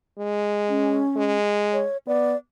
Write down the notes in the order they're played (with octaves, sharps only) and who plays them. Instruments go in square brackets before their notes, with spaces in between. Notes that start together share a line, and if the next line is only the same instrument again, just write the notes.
[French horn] G#3
[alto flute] C#4
[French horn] G#3
[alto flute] C#5
[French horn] B3 [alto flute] D5